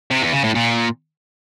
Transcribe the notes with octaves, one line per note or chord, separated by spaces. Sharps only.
C3
E2
C#3
A2
A#2